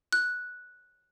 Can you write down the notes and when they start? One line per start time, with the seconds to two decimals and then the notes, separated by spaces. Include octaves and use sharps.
0.13 F#6